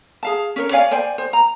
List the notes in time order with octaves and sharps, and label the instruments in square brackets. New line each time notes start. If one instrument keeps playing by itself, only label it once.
[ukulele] G#4 F5 A5
C#4 A#4 C#5
C#5 D5 F5 G#5
C5 D5 G5 G#5
C5
A#5